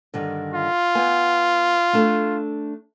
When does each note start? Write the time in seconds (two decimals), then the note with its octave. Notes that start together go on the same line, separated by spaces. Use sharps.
0.14 G2 D3 D#3
0.54 F4
0.95 B3 G#5
1.93 A3 D4 A4